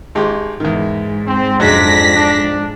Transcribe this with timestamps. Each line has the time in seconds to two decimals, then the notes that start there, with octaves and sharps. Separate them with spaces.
0.15 G#1 G#3 G4
0.60 E2 G#2 D#3
1.27 C4
1.60 F2 F#3 G#3 D4 A#6 B6
2.15 D4